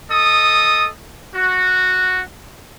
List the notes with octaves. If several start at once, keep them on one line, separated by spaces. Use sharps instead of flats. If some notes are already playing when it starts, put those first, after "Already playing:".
A4 D#5 D#6
F#4